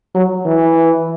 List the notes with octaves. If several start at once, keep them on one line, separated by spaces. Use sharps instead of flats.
F#3
E3